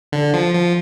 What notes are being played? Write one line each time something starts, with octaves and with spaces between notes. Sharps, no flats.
D3
F3
F3